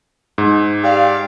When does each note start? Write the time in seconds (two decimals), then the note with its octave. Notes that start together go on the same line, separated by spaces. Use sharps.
0.38 G#2
0.84 G4 D5 F5